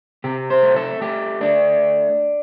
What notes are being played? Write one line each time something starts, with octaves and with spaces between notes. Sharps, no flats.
C3 G4
C5
A3
A4
A3 G4
A3 D4